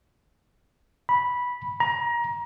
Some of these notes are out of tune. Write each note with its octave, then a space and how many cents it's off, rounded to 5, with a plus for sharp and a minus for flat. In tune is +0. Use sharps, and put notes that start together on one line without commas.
B5 -10
A#5 +25